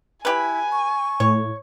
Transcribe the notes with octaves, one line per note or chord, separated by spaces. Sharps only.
E4 G4 B4 G#5
C#6
A2 C#5